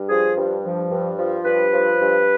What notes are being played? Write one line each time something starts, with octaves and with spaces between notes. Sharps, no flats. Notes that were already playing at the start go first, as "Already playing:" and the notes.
Already playing: G2
F3 G#4
G2
F3
G2
F3
G2 B4
F3
G2